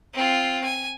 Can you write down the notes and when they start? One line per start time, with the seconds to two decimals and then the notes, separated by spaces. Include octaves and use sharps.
0.14 C4 F4
0.65 G#5